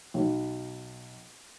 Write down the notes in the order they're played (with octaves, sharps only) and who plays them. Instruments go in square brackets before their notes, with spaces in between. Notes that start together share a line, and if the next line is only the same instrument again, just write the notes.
[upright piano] B1